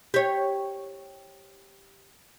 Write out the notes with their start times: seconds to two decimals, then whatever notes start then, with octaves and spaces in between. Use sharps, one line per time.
0.14 G4 C#5